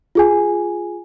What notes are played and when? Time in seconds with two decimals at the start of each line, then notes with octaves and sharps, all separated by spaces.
0.15 F4 G#4 G#5